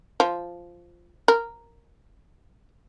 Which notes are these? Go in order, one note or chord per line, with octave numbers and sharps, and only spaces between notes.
F3
A#4